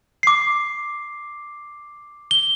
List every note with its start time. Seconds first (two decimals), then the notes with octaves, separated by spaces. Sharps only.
0.23 D6 C7
2.31 G7